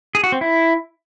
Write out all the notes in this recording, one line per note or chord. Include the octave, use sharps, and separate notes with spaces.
G#4
F#4
C4
E4